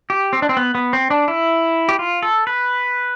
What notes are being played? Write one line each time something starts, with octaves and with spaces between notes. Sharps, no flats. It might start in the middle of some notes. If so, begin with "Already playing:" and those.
G4
C4
D4
C4
B3
B3
C4
D4
E4
G4
F4
A4
B4